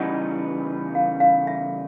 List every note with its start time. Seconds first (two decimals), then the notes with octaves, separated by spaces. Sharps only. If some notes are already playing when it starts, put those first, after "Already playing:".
Already playing: C#3 E3 G3 B3 D#4 F#5
0.95 F5
1.20 F5
1.47 E5